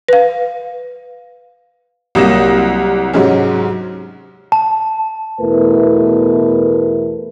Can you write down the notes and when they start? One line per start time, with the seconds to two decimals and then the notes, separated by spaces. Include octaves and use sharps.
0.08 B4 F5
2.15 C2 F#3 A#3 D#6 A#6 E7
3.13 G#2 C3 F#3 G#3 C#4
4.52 A5
5.40 E2 B2 A3 E4 A#4 B4